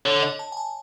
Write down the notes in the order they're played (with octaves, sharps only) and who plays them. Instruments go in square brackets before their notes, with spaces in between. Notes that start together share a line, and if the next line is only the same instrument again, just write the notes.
[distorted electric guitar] D3 [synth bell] C#5
[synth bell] D#5
A5
G#5
A5